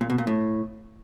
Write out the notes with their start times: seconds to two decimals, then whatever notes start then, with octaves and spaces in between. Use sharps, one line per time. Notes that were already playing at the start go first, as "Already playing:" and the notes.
0.01 A#2
0.10 B2
0.18 A#2
0.27 A2